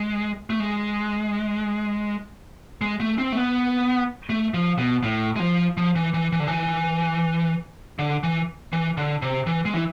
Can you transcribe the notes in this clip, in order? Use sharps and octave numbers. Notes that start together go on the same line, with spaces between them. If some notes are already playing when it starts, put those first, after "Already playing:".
Already playing: G#3
A3
G#3
G#3
A3
C4
A3
B3
A3
F3
B2
A2
G#3
F3
F3
E3
E3
E3
D3
E3
D3
E3
E3
D3
C3
E3
G#3
E3